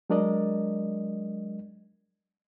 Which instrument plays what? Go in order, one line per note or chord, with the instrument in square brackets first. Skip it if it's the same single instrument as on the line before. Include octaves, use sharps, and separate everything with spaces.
[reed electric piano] F#3 G#3 D4 A#4 D5 D#5